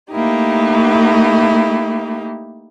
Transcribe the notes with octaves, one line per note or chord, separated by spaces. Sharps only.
A3 A#3 D#4 E4 G4